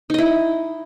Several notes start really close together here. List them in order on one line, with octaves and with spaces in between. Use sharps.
D#4 D#5 E4